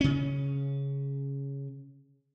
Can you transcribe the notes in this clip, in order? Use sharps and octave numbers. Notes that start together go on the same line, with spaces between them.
C#3 C#4